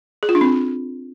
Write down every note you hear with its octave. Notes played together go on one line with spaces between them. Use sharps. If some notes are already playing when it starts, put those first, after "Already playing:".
G#4
F4
D4
C4